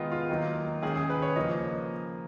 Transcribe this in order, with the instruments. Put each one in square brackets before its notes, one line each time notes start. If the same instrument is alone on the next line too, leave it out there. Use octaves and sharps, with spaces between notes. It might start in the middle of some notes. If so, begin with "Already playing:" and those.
Already playing: [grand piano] D#3 G#3 B3 D#4 F4
F4
D#3 F#3 A#3 D#4
D#3 G#3 C#4 G#4
G#4
B4
C#5
C#3 F3 A#3 D#5